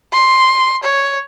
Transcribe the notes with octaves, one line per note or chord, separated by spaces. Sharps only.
C6
C#5